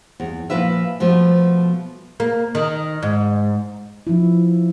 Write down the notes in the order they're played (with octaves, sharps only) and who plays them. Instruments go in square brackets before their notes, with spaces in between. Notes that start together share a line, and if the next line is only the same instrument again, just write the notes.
[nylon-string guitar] E2
A#2 F3 F4 B4 E5
B2 F3 A3
[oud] A#3
D#3
G#2
[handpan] F3 E4